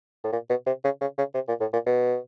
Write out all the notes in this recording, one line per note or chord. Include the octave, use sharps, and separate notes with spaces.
A2
A#2
B2
C3
C#3
C#3
C#3
C3
A#2
A2
A#2
B2